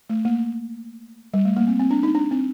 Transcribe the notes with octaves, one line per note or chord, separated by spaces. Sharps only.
A3
A#3
G3
A3
A#3
C4
C4
D4
D#4
D4
C4